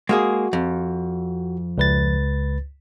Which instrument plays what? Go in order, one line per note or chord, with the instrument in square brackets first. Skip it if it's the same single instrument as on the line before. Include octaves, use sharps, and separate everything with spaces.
[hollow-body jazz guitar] G#3 A#3 G#4 [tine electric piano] F#4
[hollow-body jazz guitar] F2
[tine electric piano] C#2 B4 A6